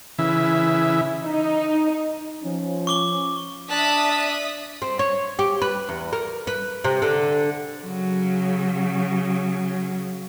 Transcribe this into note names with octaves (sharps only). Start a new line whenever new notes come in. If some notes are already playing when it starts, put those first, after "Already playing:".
C#3 E3 E5
D#4
F3 C#4
C#6 D6 G7
D4 E5 A5 D#6 F#6 B6
C4
C#5
G4
B4
E2
A#4
B4
C3
D3
C#3 F#3